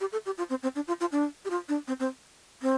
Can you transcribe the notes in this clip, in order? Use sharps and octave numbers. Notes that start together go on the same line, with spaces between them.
G4
A4
G4
F4
C4
C4
D4
F4
F4
D4
G4
F4
D4
C4
C4
C4